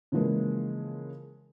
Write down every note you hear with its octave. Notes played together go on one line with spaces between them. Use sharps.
C#3 E3 F3 G#3 A#3